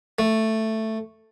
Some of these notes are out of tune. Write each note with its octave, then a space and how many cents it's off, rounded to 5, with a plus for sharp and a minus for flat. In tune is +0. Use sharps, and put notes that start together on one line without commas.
A3 +5